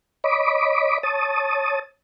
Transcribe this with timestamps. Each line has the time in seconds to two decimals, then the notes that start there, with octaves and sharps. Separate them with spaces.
0.24 C#5 D#5 B5 D6
1.03 C#5 A5 D#6